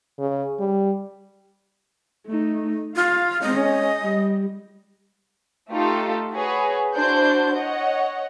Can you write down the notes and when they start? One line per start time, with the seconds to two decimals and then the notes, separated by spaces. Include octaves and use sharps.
0.19 C#3
0.59 G3
2.27 A3 D#4
2.96 F4 F5
3.42 G#3 C#4 D#5
4.02 G3
5.71 A3 D#4 F4 G4 A4
6.32 F#4 G#4 B4 C#5
6.96 D4 E4 F#4 C5 A5 G6
7.54 C#5 D#5 F#5